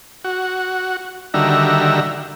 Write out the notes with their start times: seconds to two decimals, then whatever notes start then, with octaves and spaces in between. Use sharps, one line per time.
0.24 F#4
1.34 D3 D#3 G3 F#4 E5 A#5